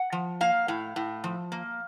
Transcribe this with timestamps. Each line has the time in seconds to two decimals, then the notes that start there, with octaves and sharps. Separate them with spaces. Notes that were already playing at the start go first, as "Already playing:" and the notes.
Already playing: F#5
0.12 F3
0.41 A#3 F5
0.68 A2
0.96 A2
1.24 F3
1.52 A#3